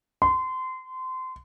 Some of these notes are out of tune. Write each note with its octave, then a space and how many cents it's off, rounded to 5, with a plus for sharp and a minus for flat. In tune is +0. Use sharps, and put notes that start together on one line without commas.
C6 -25